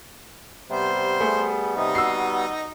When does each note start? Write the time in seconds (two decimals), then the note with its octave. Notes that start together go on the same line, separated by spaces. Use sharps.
0.70 C3 G3 B3 C5
1.20 A3 G#4
1.77 C3 D#4 D#5
1.95 F#4 E6 C7